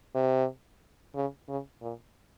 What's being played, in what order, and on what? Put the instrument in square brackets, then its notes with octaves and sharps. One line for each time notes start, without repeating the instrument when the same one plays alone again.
[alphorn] C3
C#3
C#3
A#2